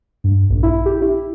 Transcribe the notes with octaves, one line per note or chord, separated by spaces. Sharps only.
G2
A#1
E4
G4
E4